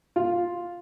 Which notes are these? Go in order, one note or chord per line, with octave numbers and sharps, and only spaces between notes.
F4